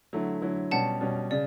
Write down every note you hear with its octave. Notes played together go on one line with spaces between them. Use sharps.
D3 F#3 A3 E4
D3 F#3 A3 E4
B2 G3 C#4 F#5 A5
B2 G3 C#4
C#3 D5